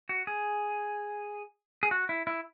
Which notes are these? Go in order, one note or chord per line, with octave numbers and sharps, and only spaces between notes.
F#4
G#4
G#4
F#4
E4
E4